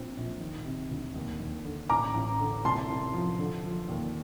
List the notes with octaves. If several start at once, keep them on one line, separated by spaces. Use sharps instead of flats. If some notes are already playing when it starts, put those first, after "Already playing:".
Already playing: A#1 C4
A#1
D#3
C3
D2
D#2
D#2
D3
A1 A#5 D6
A1
D3
C2 A5 C6
C2
F3
D3
F3
D#2